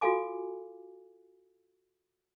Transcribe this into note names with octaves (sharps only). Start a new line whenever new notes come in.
F4 F#4 A4 F5 G#5 D6